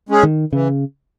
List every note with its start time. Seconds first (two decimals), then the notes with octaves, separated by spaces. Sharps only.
0.09 G#3 C#4 G#4
0.23 D#3
0.53 C#3 E3